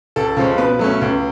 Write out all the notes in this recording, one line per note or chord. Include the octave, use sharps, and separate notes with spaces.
C#2 A4
C#3 F3 G#3 C#4
B2 B4
F#3 A3 C#4
C#2